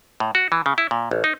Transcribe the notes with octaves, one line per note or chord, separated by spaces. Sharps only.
A2
F#4
E3
C#3
E4
A#2
A1
D#4